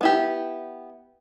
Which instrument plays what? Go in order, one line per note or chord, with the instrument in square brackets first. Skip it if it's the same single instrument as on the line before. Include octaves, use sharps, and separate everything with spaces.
[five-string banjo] B3 E4 G4